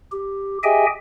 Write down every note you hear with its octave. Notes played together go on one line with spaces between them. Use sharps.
G4
G4 G#4 D#5 E5 G5 G#5